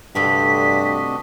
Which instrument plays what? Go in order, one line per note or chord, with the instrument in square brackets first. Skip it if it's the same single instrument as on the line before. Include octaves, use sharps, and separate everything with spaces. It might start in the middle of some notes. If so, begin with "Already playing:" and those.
[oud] D2 C3 A4 [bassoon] G2 [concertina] D4 F#4 D#5 [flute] B6